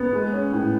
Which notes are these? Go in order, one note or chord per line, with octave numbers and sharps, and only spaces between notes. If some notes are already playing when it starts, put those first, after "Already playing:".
Already playing: B3
G#3
C#4
A2